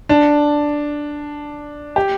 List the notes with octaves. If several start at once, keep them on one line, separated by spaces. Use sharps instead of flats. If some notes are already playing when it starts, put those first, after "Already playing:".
D4
G4